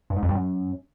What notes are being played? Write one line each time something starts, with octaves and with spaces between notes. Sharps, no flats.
G2
G#2
F2
G2
F#2